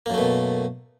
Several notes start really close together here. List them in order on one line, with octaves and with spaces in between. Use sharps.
A#3 F#2 A3 B2